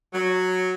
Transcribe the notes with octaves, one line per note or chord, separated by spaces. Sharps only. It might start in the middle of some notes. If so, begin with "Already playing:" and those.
F#3